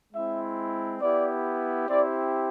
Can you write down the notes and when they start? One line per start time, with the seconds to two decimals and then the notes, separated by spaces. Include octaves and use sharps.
0.13 G#3 C4 E4 E5
1.00 B3 E4 G4 D5
1.87 C4 E4 G4 D5